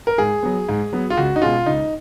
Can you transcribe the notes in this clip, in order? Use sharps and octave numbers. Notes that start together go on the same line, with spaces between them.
A#4
G#2 G#4
F#3 B3
G#2
F#3 B3
F4
C#2 F#4
D#4
B2 G#3 C#4 F4
C#2 D#4